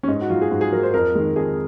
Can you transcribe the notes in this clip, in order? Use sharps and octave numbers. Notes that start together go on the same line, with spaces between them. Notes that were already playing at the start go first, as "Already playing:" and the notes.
C#4
G#2 D#4
F#4
F#3 F4
G#4
G#2 F#4
G#4
F#3 A#4
C5
F2 A#4
D#3 G#3
F2 G#4